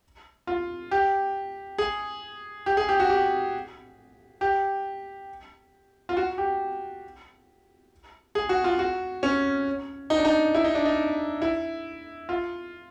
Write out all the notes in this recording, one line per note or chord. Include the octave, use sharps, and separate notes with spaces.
F4
G4
G#4
G4
G#4
G4
F#4
G4
G4
F4
F#4
G4
G#4
F#4
F4
F#4
C#4
D#4
D4
D#4
E4
D#4
D4
D#4
E4
F4